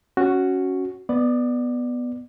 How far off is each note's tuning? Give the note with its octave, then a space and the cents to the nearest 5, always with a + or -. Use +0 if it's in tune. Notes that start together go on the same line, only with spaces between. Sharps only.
C#4 +0 F#4 +0
B3 +0 D5 +15